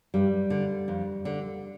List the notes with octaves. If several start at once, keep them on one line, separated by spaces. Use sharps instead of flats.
G2 G3
D3
F2
D3